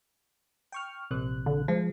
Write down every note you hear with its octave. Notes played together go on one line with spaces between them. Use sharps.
G5 C#6 F6
A#1 C3 F#6
D3
F3 G#3